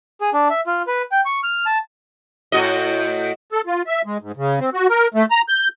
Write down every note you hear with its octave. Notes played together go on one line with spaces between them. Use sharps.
G#4
D4
E5
F4
B4
G5
C#6
F6
A5
A2 F#4 D#5
A4
F4
E5
G#3
G#2
C#3
C4
F#4
A#4
A3
A#5
G6